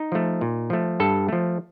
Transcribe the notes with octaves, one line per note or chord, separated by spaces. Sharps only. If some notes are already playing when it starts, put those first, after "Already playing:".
Already playing: D#4
F3 A3
A#2
F3 A3
G2 A4
F3 A3